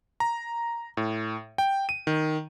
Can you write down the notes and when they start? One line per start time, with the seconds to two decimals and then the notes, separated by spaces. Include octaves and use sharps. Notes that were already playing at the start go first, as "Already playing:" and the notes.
0.20 A#5
0.97 A2
1.58 G5
1.89 D#7
2.07 D#3